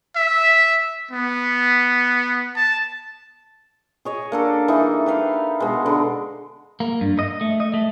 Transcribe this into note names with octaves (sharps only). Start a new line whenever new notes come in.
E5
B3
A5
G#4 C#5 D#5
A#3 D4 A4
E3 D#4
G4 B4 F5
B2 G#3
D3 B4
A#3
G2
D#5
A3
D#5
A3